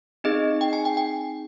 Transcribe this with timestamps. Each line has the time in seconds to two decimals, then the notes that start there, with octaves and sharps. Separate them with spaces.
0.24 C4 D#4 G#4 D#5
0.61 G5
0.73 G#5
0.85 G5
0.97 G5